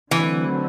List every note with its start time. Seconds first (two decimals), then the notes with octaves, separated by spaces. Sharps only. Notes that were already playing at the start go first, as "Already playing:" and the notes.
0.11 D3 E3 F#3 A3 C4